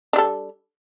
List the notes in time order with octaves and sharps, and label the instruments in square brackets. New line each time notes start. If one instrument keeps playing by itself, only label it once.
[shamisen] D4
G3
A4